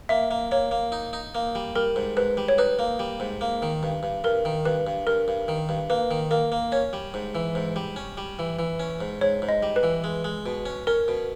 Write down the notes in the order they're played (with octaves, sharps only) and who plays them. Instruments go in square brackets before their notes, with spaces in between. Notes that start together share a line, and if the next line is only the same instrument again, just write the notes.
[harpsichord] A#3 [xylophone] E5
[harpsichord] A#3
[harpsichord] A#3 [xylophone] C#5
[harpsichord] A#3
D#4
D#4
A#3
G3
[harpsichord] G3 [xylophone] A#4
[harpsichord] G#2
[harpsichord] G#2 [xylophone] B4
[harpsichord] G3
[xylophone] C#5
[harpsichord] D#4 [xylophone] B4
[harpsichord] A#3
G3
G#2
A#3
D#3
G2
G2
[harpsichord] G2 [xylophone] A#4
[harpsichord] D#3
[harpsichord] G2 [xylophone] B4
[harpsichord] G2
[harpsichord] G2 [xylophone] A#4
[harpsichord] G2
D#3
G2
[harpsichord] A#3 [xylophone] B4
[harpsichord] D#3
[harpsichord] A#3 [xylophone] A#4
[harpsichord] A#3
[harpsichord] C#4 [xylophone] C#5
[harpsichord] G3
G#2
E3
G#2
G3
C#4
G3
E3
E3
C#4
G#2
[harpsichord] G#2 [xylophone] C#5
[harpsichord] G#2
[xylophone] D#5
[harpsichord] G3
[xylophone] B4
[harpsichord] E3
G#3
G#3
B2
C#4
[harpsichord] C#4 [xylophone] A#4
[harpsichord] B2